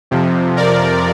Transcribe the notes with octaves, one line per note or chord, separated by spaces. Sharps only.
F2 C3 F3
A#4 D5